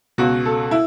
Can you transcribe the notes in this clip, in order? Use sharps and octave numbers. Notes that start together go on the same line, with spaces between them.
C#2 B2 F#4
A4
E4